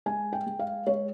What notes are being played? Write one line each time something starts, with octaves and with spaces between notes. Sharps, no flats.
G#3 G#5
G5
G#3
F5
G#3 C#5